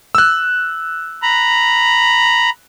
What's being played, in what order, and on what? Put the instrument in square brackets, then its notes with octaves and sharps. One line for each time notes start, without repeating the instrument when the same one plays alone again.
[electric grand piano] E6 F#6
[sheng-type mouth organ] A#5 B5